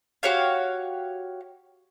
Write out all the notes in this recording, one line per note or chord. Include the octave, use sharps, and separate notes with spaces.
F#4 G4 C#5 F5